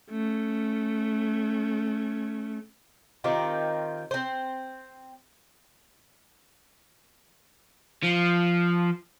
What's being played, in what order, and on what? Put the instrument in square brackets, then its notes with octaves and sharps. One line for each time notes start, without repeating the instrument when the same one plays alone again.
[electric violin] A3 C#4
[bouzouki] D#3 C4 F4 G4
C4 C5
[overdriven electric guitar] F3